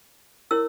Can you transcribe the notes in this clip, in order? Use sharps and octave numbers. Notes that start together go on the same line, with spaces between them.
E4 A#4 C#5 E6